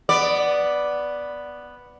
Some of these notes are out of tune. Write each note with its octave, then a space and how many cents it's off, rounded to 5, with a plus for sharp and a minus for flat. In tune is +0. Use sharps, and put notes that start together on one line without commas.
B3 +0 D5 +0